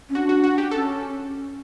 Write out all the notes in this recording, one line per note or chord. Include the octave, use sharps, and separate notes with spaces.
C#4
D4 F#4
F#4
F#4
G4
C#4 A4